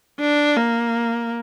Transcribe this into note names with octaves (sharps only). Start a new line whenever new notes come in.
D4
A#3